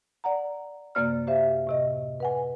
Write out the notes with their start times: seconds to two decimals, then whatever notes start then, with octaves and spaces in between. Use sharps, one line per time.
0.24 D5 F#5 A#5
0.95 F#2 C3 A#3 D5 F6
1.27 G4 C5 E5 F5
1.67 A2 C3 D#5
2.20 B4 F#5 G#5